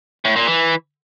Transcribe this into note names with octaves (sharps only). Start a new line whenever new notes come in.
A2
A#2
E3